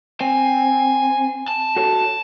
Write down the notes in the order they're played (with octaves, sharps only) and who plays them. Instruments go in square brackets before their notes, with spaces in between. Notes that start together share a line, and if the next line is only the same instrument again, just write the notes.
[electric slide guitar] C4 [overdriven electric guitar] G#5
[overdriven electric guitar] A5
[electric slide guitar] F#4 A4 C#5